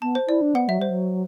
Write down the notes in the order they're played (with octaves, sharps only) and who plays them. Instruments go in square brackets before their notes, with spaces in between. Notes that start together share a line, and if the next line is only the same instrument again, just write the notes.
[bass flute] B3 [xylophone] A5
[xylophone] C5
[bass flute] E4 [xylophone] D5
[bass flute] D4
[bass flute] B3 [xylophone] F#5
[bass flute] F#3 [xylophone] E5
[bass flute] G3 [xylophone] C5
[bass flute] F#3